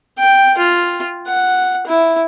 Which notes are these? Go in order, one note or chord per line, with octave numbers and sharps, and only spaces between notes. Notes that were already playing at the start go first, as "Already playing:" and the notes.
G5
F4
F#5
E4